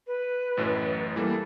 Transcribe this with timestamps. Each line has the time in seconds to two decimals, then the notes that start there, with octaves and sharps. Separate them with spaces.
0.07 B4
0.57 A1 F#2 A2
1.16 E3 G3 A#3 A4